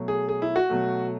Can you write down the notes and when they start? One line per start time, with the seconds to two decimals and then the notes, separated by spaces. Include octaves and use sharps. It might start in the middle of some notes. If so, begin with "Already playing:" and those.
Already playing: B2 F#3 A3
0.08 G#4
0.29 G#4
0.42 E4
0.56 F#4
0.69 B2 F#3 A3